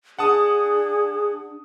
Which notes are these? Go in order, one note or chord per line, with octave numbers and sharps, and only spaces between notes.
D4 G#4 F#5 A5 D#6